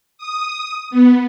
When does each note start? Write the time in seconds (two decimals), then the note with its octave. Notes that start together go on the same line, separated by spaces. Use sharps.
0.18 D#6
0.91 B3